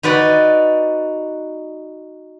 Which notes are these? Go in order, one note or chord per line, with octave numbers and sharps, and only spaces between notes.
D#4 F#4 B4 D5